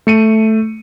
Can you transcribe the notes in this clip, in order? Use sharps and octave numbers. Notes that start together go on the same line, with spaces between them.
A3 C#7 D#7